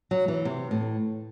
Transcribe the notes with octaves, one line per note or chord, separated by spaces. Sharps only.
F#3
E3
C3
A2